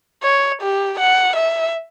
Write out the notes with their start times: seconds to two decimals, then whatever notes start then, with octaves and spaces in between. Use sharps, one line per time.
0.22 C#5
0.62 G4
0.99 F#5
1.36 E5